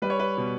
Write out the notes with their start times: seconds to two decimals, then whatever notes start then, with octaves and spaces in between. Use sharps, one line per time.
0.02 G3 B4
0.10 C#5
0.19 B4
0.37 B2